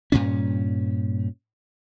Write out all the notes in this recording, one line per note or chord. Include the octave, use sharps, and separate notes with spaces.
G2 A#2 C#4